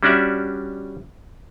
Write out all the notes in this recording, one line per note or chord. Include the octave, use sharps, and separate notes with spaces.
G3 C#4 D4 F#4 D5 E5